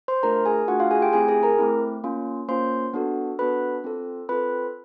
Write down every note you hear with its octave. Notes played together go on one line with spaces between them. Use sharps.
C5 C6
A3 D4 F4 A#4 A#5
G#4 G#5
A3 D4 F4 F#4 F#5
F4 F5
G#4 G#5
G4 G5
A3 C4 E4 G#4 G#5
G#4 G#5
A#4 A#5
A3 C4 E4
A#3 C#4 F4
A#3 C#4 F4 C5 C6
B3 D4 F#4 A4
B3 D4 F#4 A4 B4 B5
C4 F4 A4
C4 F4 A4 B4 B5